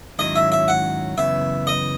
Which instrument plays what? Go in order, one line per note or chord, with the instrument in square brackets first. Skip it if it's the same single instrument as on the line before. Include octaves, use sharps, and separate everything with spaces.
[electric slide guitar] G#2 D#3 F#3 C#4 E4 [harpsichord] D#5
[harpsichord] E5
E5
F#5
[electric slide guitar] F#2 C#3 E3 B3 [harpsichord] E5
[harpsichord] D#5